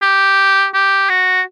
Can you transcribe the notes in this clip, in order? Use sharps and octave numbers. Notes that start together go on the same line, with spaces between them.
G4
G4
F#4